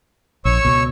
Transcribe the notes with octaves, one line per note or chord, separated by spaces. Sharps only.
A#1 C#5 C#6 E6
C#2 B2